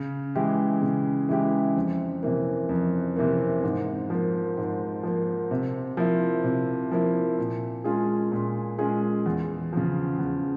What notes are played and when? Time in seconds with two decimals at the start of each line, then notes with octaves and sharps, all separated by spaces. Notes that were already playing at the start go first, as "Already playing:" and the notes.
Already playing: C#3
0.35 E3 G#3 E4 G4
0.82 C#3
1.29 E3 G#3 E4 G4
1.76 F2
2.23 C3 E3 A#3
2.69 F2
3.17 C3 E3 A#3
3.63 G#2
4.10 F3 A#3
4.57 G#2
5.03 F3 A#3
5.51 C3
5.97 F3 A#3 E4
6.44 C3
6.91 F3 A#3 E4
7.38 A#2
7.84 G#3 C#4 F4 G#4
8.32 A#2
8.78 G#3 C#4 F4 G#4
9.26 E2
9.73 C#3 F3
10.19 E2